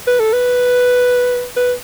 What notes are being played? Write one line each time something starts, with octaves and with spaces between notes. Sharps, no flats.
B4
A4
B4
B4